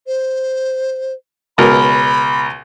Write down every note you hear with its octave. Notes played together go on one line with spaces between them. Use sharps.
C5
C#2 B2 A#4 B5